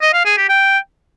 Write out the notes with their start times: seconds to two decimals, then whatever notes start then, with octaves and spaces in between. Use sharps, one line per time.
0.02 D#5
0.14 F5
0.25 G#4
0.37 G4
0.49 G5